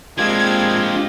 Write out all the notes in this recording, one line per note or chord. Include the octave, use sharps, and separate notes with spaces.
G#3 A#3 C4 D4 F4 G4 G#6